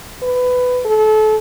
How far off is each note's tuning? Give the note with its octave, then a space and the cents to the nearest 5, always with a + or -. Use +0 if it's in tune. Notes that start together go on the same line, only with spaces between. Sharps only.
B4 +15
A4 -30